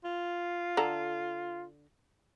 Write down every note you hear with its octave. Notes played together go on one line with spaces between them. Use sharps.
F4
D3 A4 A#5